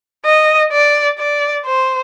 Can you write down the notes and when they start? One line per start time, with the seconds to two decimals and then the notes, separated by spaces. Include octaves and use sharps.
0.25 D#5
0.72 D5
1.18 D5
1.66 C5